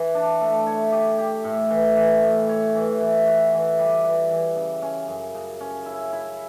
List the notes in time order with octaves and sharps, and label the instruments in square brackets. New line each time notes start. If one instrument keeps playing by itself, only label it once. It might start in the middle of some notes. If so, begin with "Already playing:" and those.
Already playing: [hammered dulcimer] E3
D4
A3
C#5
G4
G4
A2
E3
E3
A2
C#5
E3
E3
F#4
E3
G3
E3
E3
C#3
C#4
F#2
C#3
C#4
E4
E4